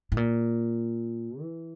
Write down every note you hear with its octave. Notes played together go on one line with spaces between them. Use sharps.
A2
A#2
E3